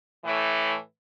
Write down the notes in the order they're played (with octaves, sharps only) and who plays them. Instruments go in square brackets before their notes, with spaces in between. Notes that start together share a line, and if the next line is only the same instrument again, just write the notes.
[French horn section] A2 E3